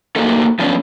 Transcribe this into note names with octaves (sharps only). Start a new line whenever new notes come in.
A3 A#3 D#4 F#4 G4 A4
F3 A3 B3 C#4 D4